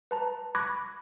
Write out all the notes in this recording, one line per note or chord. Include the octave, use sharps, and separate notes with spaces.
B4 A5 A#5
B5 C#6 D6 F#6 G#6 A#6